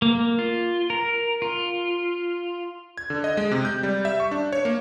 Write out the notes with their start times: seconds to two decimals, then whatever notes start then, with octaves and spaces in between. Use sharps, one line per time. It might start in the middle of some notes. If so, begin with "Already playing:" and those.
0.02 A#3
0.39 F4
0.90 A#4
1.42 F4
2.98 G#6
3.10 D3
3.24 D#5
3.37 G#3
3.52 C3
3.65 G6
3.83 G3
4.05 E5
4.20 C#6
4.31 D4
4.53 C#5
4.65 A#3